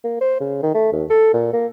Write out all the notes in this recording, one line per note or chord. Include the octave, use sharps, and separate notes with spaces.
A#3
C5
C#3
D#3
A3
D#2
A4
A#2
A#3